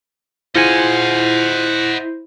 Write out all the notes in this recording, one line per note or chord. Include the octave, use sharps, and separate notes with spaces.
E4 F4 G#4 C5 D#5 F#5 G#5